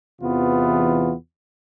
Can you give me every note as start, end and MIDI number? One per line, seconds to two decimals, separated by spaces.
0.22 1.13 40
0.22 1.13 48
0.22 1.13 52
0.22 1.13 59
0.22 1.13 65